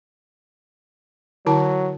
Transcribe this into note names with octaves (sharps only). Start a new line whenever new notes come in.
D3 F#3 E4 A5